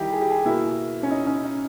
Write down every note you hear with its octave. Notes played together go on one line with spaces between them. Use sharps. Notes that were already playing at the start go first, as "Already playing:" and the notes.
Already playing: D#3 G3 E4 G4
G#4
G4
G#4
B2 A#3 E4
C#4
D#4
C#4
D#4